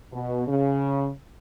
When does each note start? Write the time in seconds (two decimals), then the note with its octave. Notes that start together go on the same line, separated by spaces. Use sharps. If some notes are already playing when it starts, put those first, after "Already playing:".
0.13 B2
0.48 C#3